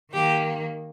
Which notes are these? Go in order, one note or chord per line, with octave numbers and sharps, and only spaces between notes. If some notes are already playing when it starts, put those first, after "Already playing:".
D#3 A#3 G4